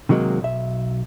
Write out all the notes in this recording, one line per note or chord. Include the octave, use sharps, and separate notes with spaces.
C3 D#3 F#3 G#3 A#3
B1 E5